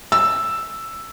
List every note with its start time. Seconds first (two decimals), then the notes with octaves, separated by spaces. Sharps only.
0.12 E6